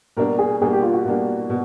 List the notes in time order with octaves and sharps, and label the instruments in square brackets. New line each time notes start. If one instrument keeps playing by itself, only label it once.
[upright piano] B2 G3 A#3 D4 [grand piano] A#4
[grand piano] G#4
[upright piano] B2 G3 A#3 D4 [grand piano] G#4
[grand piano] G4
F4
F#4
[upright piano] B2 G3 A#3 D4
B2